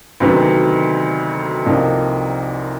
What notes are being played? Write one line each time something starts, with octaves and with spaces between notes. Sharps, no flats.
D2 C3 D#3 F#3 B3
C2 C3 F3 A#3 D#4